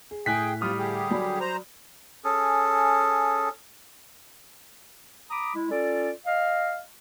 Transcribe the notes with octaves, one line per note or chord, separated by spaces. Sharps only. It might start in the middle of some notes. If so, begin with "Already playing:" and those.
G#4
A2 G#4 G5 G#5 F#6 B6
C3 G3 F4 D#6 F6
D3 G4 G#4
F#3 D5 B5
C5 A#5
C#4 G#4 A4
A#5 B5 D6 D#6
G#3 E4
C#4 F4 A4 D5
D#5 F5